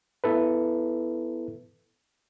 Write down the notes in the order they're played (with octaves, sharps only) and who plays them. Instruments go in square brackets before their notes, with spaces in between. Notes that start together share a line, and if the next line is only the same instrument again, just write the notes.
[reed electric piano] B3 E4 A4 B4